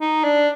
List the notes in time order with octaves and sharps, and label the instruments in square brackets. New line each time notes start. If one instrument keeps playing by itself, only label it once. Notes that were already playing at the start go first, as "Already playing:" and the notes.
[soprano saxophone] D#4
D4